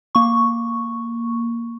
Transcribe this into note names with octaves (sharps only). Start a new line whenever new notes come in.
A#3 C#6